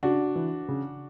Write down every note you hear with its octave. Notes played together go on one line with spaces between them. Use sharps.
C#3 D4 F#4
E3
C#3